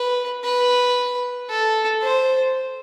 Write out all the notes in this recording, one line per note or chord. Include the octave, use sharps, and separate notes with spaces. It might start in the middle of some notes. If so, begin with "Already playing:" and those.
Already playing: B4
B4
A4
C5